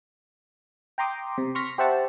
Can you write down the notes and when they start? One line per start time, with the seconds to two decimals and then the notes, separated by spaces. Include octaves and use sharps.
0.98 G5 A#5 C6 D6 D#6
1.38 C3
1.55 C6 C#6 F6 A#6 B6
1.78 G4 C5 E5 F#5 A5 C#6